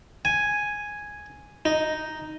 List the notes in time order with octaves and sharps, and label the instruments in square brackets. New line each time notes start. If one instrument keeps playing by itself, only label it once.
[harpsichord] G#5
D#4